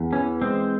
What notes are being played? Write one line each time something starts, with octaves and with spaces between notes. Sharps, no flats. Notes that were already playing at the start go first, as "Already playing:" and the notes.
Already playing: E2
E3 C#4
G#3 C4